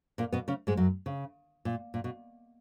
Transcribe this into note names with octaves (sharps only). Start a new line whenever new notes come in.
A#2 A#3
B2 B3
C#3 C#4
G#2 G#3
F#2 F#3
C#3
A#2
A#2
B2